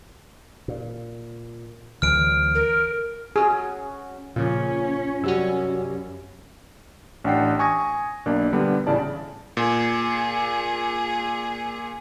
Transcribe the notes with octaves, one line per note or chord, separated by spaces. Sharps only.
A#2
D2 E3 F#3 F6 D7
A#4
C#4 F#4 G#4
A#2 C#3 F3 C#4 F4
F#2 C3 G3 C#4 F#4 E6
A1 D4 F#5 G5 C7
G#5 C#6 D#6 G#6 A#6
B1 A#3 D4
D3 G3 B3
A1 C#3 E4 D5 A5
A#2 G#4